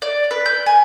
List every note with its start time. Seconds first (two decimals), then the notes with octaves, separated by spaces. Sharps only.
0.02 D5
0.31 B4
0.46 G6
0.66 G#5